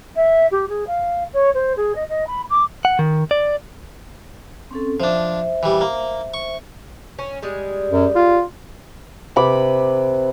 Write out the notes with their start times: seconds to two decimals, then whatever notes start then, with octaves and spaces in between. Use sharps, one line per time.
0.15 E5
0.51 G4
0.68 G#4
0.87 F5
1.33 C#5
1.54 C5
1.76 G#4
1.95 D#5
2.08 D#5
2.27 B5
2.49 D6
2.85 F#5
2.99 D#3
3.31 D5
4.71 C4 C#4 A4
5.00 F3 D4 C5 E5
5.63 E3 G3
5.81 A#3
6.34 C#6
7.19 C#4
7.42 G3 G#3
7.91 F#2
8.15 F4
9.36 C3 B4 B5 D6